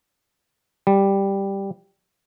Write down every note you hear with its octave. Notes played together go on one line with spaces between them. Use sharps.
G3